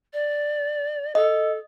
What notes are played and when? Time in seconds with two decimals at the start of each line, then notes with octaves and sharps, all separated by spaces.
0.13 D5
1.15 A4 D#5